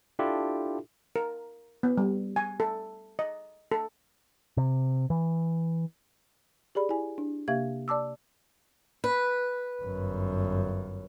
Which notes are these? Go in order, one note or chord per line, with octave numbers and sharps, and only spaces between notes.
D4 E4 F4 G4 A4
A#4
B3
G3
G#5
A4
D#5
A4
C3
E3
G4 G#4 D5 B5
E4 G#5
D4
C3 A#3 G4 E5 F5 G#6
D5 A5 D6 E6
B4
G1 F#2